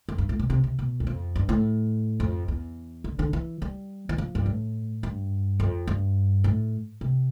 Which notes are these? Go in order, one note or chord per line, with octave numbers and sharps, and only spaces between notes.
F2
G2
A2
B2
C3
C3
B2
E2
F2
G2
A2
F2
E2
D3
D3
E3
G3
E3
F3
G2
A2
G2
F2
G2
A2
C3